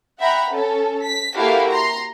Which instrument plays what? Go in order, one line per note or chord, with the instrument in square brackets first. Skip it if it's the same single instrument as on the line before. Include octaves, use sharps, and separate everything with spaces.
[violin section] E5 F#5 G5 A#5 B5
C#4 A4
B6
A#3 E4 F#4 G4 A4 F5
A#5 C6